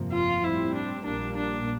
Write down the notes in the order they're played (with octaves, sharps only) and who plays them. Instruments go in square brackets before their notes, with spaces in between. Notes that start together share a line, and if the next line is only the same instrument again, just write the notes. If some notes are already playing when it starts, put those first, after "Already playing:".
Already playing: [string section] G1 F2 C3 F3 A#3
[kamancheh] F4
[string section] A2 G3 C4 [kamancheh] E4
[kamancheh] D4
[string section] A#1 A#2 G3 A#3 [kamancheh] D4
[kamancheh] D4